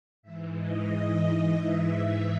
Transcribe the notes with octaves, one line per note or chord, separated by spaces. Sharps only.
G#2 E3 E5
D#5
G#2 E3 E5